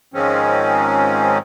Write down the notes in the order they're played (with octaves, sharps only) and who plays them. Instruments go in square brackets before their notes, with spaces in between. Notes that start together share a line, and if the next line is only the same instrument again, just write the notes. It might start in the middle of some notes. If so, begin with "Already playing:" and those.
[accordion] G#2 D#3 F3 G#3 C4 C#4